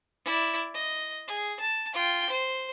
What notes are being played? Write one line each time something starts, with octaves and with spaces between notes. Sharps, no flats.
E4 D5
D#5
G#4
A5
F4 G5
C5